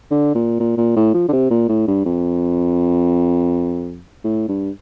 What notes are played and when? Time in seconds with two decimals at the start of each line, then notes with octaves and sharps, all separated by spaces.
0.11 D3
0.35 A#2
0.60 A#2
0.77 A#2
0.96 A2
1.14 F3
1.28 D3
1.33 C3
1.51 A#2
1.69 A2
1.87 G2
2.05 F2
4.24 A2
4.48 G2